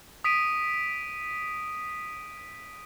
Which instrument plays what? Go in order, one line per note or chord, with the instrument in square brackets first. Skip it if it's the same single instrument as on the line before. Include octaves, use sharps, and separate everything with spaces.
[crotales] D#6 B6 D7 D#7